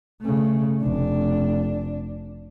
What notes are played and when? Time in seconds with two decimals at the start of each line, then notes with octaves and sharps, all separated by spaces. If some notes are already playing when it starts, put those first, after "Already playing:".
0.22 C#3 A3
0.81 F1 D4